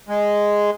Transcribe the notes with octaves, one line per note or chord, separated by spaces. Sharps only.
G#3